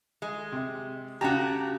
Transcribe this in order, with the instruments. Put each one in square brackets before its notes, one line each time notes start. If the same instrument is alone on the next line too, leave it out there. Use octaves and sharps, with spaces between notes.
[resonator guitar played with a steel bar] G#3
[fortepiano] C3
[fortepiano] C#3 A5 A#5 [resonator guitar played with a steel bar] F#4 G4